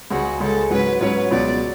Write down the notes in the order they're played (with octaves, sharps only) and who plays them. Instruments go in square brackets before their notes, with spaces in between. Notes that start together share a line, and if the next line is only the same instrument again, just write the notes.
[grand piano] C#2 C#3 G#3 [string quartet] F#4
[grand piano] C#2 C#3 G#3 [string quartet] A4
[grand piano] G#2 F#3 C#4 [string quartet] B4
[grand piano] G#2 F#3 C#4 [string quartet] B4
[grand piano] C#2 B2 F#3 [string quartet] D5